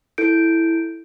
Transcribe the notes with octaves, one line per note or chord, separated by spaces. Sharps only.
E4 A4 G6 D7